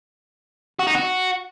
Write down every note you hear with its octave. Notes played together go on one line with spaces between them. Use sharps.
F#4
D#4
F#4